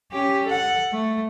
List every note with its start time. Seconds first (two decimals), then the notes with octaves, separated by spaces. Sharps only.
0.12 C#4 G4
0.46 A4 F#5
0.92 A3